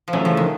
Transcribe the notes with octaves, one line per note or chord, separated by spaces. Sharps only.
F3
C#3 E3 F#3 A3 C#4
F3
D#3